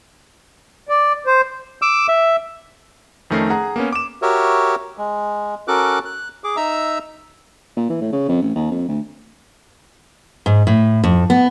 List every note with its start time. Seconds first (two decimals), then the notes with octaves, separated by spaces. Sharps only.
0.89 D5
1.26 C5
1.82 D6 E6
2.08 E5
3.30 F2 D#3 A3 C#4 A#4 C7
3.50 G#4 F#5 A#5
3.76 A#3 B3 C#4
3.93 D6 E7
4.22 F#4 G4 A#4 C#5 E5
4.98 G#3
5.68 C#4 F#4 A4 A#4 D6 F#6
6.05 F#6
6.44 G#4 D6
6.57 D#4 E5 A#5 E6
7.77 A#2
7.89 E3
8.01 A2
8.12 C#3
8.29 F2
8.42 A1
8.55 D#2
8.71 F2
8.88 D2
10.46 G#2
10.67 A2
11.04 F2
11.30 B3